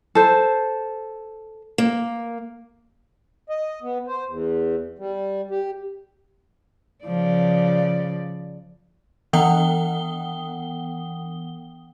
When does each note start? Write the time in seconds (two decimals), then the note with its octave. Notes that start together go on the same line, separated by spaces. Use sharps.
0.15 A4 C5
1.78 A#3
3.49 D#5
3.82 B3
4.07 C5
4.28 E2
4.99 G3
5.51 G4
7.05 C#3 F3 D5
9.33 E3 B3 F#5 G5 D#6 G7